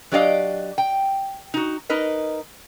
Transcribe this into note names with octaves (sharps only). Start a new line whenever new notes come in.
F#3 D4 G4 D5 D#5 F5
G5
D#4 F#4
D#4 A#4 B4 D#5